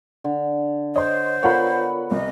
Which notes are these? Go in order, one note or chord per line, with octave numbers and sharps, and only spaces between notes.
D3
C5 C#5 D#5 C6
B3 F4 A4 A#4 C#5 F#5 B5
C2 D#5